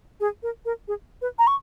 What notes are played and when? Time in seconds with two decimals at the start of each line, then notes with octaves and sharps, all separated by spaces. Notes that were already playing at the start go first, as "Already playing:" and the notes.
0.20 G#4
0.43 A#4
0.65 A#4
0.88 G#4
1.22 B4
1.39 A#5
1.47 C#6